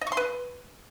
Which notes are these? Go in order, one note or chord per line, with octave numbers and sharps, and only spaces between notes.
D#5
C#6
C6
B4